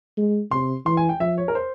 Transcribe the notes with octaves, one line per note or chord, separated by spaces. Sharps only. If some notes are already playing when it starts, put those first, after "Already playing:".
G#3
C3 C6
E3 C6
G#5
G5
F3 E5
C#5
A#4
C5